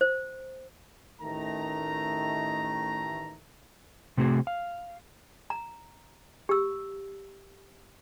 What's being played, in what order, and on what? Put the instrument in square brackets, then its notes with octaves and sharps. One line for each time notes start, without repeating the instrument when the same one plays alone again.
[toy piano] C5
[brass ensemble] A1 D#3 A3 A#5
[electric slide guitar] C3 A3 C4 F#4 G#4
F5
[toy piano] A#5
G4 E6